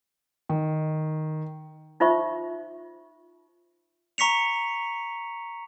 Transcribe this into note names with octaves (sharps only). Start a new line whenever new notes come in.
D#3
D#4 F4 C5 E5 C#6
A#5 C#6 B6 C#7 F7